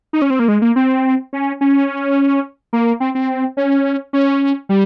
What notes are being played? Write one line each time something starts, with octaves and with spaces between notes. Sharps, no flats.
D#4
C#4
C4
A#3
G#3
A#3
C4
C#4
C#4
A#3
C4
C4
C#4
C#4
G3